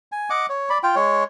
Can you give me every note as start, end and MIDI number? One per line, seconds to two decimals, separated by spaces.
0.12 0.30 80
0.30 0.46 75
0.30 0.46 78
0.30 0.46 86
0.49 0.69 73
0.70 0.78 74
0.70 0.78 83
0.83 0.95 65
0.83 0.95 79
0.95 1.24 56
0.95 1.24 73